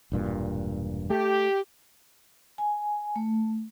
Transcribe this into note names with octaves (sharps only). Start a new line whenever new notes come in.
E1 G2 A#2
A3 G4
G#5
A3